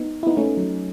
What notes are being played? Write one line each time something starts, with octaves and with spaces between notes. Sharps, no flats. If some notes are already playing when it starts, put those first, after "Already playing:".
Already playing: B3 D#4
E4
B3 D#4
A3 C#4
F#3